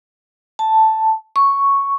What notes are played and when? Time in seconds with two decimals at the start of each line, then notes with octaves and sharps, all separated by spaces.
0.59 A5
1.36 C#6